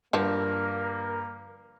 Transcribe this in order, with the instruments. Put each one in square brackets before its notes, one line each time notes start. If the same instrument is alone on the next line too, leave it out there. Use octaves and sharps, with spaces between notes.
[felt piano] G2 [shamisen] D3 F3 A5 [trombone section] A#3 [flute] A#4